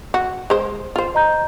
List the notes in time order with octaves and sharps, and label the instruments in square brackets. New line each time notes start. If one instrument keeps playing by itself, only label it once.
[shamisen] F#4
G#3 C5
F4 C5
[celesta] D#5 A#5 G6